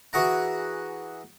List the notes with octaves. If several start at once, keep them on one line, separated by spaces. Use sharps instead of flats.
E3 F#4 G#4 F#5 A#5